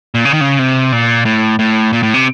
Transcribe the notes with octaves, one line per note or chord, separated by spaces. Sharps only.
A#2
C#3
D#3
C#3
C3
A#2
A2
A2
A#2
A2
C3